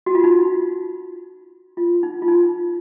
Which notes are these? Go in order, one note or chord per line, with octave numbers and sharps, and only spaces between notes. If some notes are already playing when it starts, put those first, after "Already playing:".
F#4
F4
D#4
F4
D#4
F4
D#4